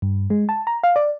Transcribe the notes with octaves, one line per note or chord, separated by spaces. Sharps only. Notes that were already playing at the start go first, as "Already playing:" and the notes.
G2
G#3
A5
A#5
F5
D5